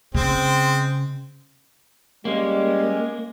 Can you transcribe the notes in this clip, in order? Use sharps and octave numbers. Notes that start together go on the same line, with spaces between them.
C#3 G#3 C4
G3 G#3 A#3 C#4 G4 G#4